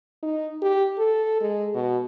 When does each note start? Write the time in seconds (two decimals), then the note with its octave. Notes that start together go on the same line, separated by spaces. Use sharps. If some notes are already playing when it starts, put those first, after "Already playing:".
0.23 D#4
0.62 G4
0.98 A4
1.41 G#3
1.75 B2